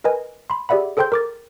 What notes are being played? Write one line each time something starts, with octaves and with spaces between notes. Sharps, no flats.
A#4 B4 D#5 G#5
B5 C6
G4 G#4 D5 E5 F#5 B5
G#4 A4 C5 G5 C6 G6
A#4 D6 A6